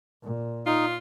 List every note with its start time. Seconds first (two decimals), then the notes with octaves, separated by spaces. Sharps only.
0.24 A#2
0.66 D#4 F4